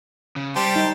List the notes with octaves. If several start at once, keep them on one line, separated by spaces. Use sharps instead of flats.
C#3
G3 G4 C5 A5
D#4